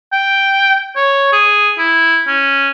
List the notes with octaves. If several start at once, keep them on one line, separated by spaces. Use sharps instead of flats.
G5
C#5
G#4
E4
C#4